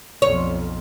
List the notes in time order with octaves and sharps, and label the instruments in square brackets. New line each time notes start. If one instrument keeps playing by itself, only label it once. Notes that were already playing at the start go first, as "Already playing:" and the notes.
[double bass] B1 F2 [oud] C#5